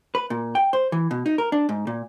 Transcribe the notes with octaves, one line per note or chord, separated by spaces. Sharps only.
B4
A#2
G5
C5
E3
B2
D#4
A#4
D4
G#2
A#2